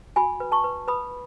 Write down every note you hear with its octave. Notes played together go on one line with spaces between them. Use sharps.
F#4 G#5 B5
B4
A5 C#6
B4
B4 B5 D#6